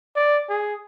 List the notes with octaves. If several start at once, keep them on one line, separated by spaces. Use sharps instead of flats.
D5
G#4